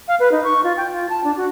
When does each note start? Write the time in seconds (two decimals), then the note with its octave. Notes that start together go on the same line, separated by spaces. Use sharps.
0.08 F5
0.20 B4
0.32 D#4
0.44 C#6
0.64 F4
0.77 G5
0.92 F4
1.10 A5
1.24 D4
1.37 F#4